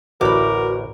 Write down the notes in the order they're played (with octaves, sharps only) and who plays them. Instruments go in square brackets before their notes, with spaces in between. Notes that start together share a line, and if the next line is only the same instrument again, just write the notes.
[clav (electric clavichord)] A1 D2 [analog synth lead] F#4 [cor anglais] A#4 [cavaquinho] B5 D6